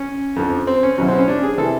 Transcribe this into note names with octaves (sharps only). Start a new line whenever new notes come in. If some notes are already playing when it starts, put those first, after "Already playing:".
Already playing: C#4
F2 D3 F3
C4
C#4
E2 B2 F#3 C#4
C4
C#4
D4
G#4
C3 E3 A4